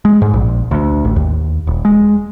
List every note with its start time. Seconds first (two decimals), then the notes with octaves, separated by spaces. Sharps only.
0.05 G#3
0.22 G#2
0.33 A#1
0.71 D2
1.05 A1
1.16 D#2
1.67 D#1
1.85 G#3